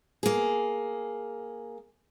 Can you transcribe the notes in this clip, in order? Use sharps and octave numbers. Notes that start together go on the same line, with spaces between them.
A#3 G#4